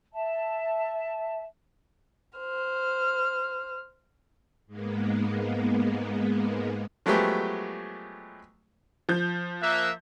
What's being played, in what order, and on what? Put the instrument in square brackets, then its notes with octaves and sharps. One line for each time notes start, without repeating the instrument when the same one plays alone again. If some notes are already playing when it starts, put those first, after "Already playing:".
[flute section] E5 A5
[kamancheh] C5 F6
[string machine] G#2 G#3 A#3 B3
[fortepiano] F3 F#3 G#3 A3 B3 G4
[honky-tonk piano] F3 G6
[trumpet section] A#3 E5 [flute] F#6